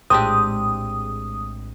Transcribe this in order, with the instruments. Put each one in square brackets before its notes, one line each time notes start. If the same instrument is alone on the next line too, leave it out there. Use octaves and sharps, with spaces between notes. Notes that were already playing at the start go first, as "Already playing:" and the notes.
[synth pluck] A#1 A2 G#3 [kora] C4 D4 G4 [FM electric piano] D#6